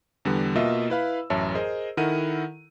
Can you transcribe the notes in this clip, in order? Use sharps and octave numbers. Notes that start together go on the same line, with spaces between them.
E2 D3 G3 B3
B2 A#3 F4 D#5 E5 E6
E4 B4 F5 B5
A1 F#2 C#5 E5 A5
G#4 A#4 C5 D#5
D#3 E4 A4 A#4 F#5 D#7